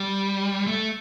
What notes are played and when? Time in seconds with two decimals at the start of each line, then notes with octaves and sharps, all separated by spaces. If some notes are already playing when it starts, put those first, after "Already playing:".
Already playing: G3
0.67 A3